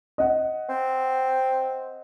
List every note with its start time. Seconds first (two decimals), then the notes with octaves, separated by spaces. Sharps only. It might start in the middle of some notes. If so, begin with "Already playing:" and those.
0.18 D#5 F#5
0.69 C4